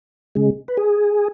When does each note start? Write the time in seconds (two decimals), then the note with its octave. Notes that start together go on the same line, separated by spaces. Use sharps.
0.35 C#3 G#3
0.68 B4
0.77 G#4